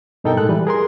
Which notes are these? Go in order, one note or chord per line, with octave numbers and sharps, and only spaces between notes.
G2 B2 D#4 A4 A#4 G5
A2 G#3 A4 F#6
E3 G3 B4
G#4 A#4 C6